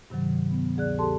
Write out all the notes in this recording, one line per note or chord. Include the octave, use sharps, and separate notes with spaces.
G2 C3 D#3 F#3
B3
D2 G#4 D5 F#6
G4 A4 A5 C6